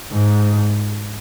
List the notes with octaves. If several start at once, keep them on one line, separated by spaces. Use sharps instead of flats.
G#2